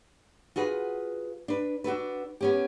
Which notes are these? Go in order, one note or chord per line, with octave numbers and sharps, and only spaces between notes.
F4 F#4 G#4 B4
D4 B4
D4 F#4 A4 B4
B3 C#4 G4